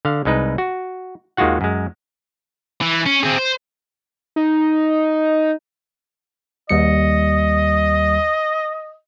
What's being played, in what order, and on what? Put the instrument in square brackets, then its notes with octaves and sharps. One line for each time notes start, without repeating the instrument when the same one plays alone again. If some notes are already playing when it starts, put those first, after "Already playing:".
[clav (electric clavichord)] D3 F5
C2 G#3 D#4 B4
F#4
D#2 D#3 G#3 F4 F#4 F#5
F#2 G#3
[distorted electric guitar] E3
C#4
C4 G#4
C5
[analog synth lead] D#4
[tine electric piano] D#2 G3 C#7 [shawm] D#5